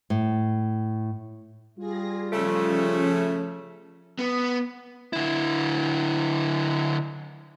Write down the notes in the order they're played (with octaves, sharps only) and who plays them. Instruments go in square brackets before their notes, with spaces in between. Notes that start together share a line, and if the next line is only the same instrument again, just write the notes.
[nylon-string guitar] A2
[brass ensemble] G3 F4 [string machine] G#4 A#6
[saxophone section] C#3 A3 [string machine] F3 C#4 [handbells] A4
[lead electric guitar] B3
D3 E4